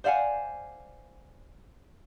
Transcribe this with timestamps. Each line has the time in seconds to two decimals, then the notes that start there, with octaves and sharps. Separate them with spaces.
0.04 C5 D5 F5 F#5 G#5